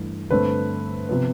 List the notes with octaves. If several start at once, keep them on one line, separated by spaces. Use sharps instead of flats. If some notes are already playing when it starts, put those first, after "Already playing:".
Already playing: G2 E3 A3
G2 D3 A3 C4 B4
C3 F3 B3